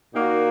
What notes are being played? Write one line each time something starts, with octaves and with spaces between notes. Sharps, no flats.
A#2 A#3 D#4 F#4